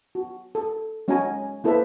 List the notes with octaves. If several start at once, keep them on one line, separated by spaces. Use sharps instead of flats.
F#4
A4
G#3 C#4 F#4 C#5 G#5 A#5
A#3 E4 A4 B4 C5 E5